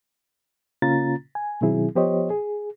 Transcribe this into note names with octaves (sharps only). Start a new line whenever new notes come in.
C#3 A#3 C#4 F4 A#5 A6
G#5
B2 D#3 F#3 C4 E4 G#4
F3 B3 G4 C5 C#5 D#5
G#4